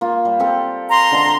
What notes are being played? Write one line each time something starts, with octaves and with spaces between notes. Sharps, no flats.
A#3 F4
G3
C4 G4 A4
A#5 C6
D3 D#5 A5